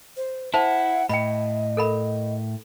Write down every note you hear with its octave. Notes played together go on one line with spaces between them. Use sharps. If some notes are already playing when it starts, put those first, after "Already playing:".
C5
E4 C5 F#5 A5
A2 D#5 G5 B5
A4 A#4 B5